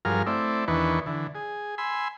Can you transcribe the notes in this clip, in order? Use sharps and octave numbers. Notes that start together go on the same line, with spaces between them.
G2 F3 F#3 G#4 A#4 F6
A3 C4 E4 D5
E2 D#3 E3 D4 B4 C#6
D3 E3
G#4
G#5 B5 C6 E6